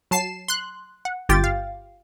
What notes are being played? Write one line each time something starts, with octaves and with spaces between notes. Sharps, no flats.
F#3 A5 C7 E7
C6 F#6
F#5
G1 F4 G4 G5 A6
F5